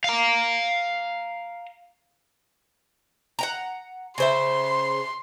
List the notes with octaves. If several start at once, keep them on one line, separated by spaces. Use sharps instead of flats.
F5 A#5
F#5 G5 A#5
C#3 C5 E5 C6